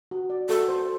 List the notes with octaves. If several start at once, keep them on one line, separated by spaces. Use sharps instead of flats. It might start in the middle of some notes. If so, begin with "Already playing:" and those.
F#4
D5
F#4 A4
C5